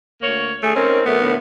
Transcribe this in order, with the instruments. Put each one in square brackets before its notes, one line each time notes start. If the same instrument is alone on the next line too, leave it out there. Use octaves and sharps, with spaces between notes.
[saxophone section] D2 A#3 C#5
[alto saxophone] A3 [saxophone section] G#4
[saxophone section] D#3 C4 [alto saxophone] C#4 [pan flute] A#4
[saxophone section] B2 A3 [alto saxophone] B3
[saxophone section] D2 A2